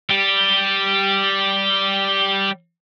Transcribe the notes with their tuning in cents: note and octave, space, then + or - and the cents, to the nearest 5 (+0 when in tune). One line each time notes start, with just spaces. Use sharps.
G3 -5 G4 +0